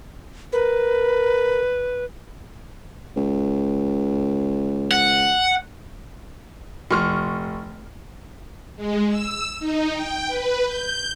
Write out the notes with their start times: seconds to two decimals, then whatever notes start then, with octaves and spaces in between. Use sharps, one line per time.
0.52 A#4 B4
3.16 C#2
4.91 F#5
6.91 F1 C6 C#6 F6
8.76 G#3
9.08 E6
9.60 D#4
9.93 G5
10.27 B4
10.64 G6